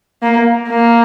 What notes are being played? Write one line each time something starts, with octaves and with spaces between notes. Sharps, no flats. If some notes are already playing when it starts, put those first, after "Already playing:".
A#3
A#3